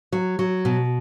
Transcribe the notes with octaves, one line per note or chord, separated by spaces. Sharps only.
F#3
F#3
B2